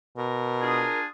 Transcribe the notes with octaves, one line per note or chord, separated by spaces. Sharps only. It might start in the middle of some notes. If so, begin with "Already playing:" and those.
B2 A#4
D4 F4 G#4